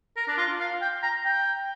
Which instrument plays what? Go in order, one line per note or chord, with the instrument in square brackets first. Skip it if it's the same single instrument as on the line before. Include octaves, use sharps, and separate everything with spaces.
[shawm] A#4
D4
F4
F5
G5
A#5
G5